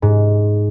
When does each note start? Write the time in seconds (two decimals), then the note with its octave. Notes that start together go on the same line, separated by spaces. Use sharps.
0.02 G#2